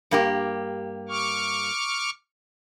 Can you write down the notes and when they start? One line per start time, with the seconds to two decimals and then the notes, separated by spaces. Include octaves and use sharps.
0.11 G2 A#3 G4
1.09 C#6 D6 F6